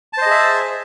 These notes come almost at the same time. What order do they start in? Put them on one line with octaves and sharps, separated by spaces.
A5 C5 D#5 G#4 E5